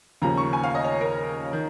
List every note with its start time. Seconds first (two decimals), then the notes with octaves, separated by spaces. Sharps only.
0.22 D#2 C#3 F3 A#5
0.38 C#6
0.53 G#5
0.63 F5
0.75 D#5
0.84 C#5
1.01 A#4
1.53 D#3